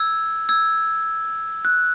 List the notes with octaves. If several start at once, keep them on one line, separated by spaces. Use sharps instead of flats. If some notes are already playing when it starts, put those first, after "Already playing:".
Already playing: E6 G#6
E6 G#6
F#6